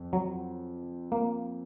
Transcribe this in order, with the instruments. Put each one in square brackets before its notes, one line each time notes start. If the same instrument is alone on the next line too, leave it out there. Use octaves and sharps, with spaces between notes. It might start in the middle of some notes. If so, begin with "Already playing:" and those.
Already playing: [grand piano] F2
[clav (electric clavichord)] F#3
A#3